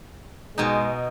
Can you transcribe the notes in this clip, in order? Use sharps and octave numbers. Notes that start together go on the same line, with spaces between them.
B2 G#3 D#4